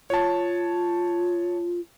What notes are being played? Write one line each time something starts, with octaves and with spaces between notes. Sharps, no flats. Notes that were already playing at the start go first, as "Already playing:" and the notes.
F4 C#5 A5